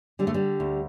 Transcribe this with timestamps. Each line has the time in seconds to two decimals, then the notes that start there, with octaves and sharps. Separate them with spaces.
0.19 D3 G3
0.27 A3
0.34 G3
0.60 D2